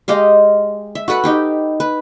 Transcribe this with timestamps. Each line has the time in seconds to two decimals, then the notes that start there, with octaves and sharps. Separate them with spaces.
0.08 G#3 G4 D#5 F5
0.95 E5
1.08 F#4 A4 B4 F#5
1.24 D#4 G4 G5
1.80 B4